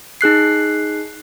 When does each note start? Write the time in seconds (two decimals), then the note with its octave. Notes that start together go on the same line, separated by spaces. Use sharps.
0.21 D#4 G#4 F#6 C7